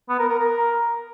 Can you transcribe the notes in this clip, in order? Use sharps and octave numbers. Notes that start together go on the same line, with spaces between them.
B3
A#4
A#4
A#4